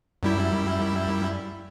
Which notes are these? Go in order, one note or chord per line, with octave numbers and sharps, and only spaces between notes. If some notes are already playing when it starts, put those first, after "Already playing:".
F#2 G3 E4